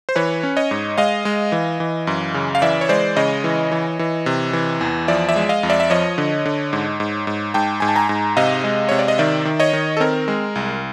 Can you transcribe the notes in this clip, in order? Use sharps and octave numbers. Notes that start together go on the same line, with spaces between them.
C5
E3 B4 C#5
C#4
C#5 D#5
G#2
G#3 D#5 F5
G#3
E3
E3
F#2
C#3
F5
E3 D5 E5
C#5
G#3 C5 D5
C#3 C#5 D#5
E3
E3
E3
C3
E3
E2
F3 D5 E5
D5 E5
G#3
D#5 F5
F2
D5 E5
E5
F3 C#5 D#5
D3
D3
G#2
G#2
G#2
G#2 G5 A5
G#2 G#5
A5
G#5 A#5
G#2
C3 D#5 F5
G#3
C3 C#5
D5
D#5
D#3 D5 E5
D#3
C#5 D#5
D#3
A4
C4 A#4
G#3
C2